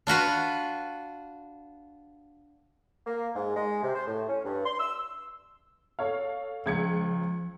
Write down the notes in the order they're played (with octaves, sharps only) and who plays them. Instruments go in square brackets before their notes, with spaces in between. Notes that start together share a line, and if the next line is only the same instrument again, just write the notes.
[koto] D4 F4 F#4 B4
[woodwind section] A#3
G#2
G#3
C3
C5
A2
C#4
G2
C6
E6
[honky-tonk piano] A4 C#5 F5
[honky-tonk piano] C#2 G#6 C#7 [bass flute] F3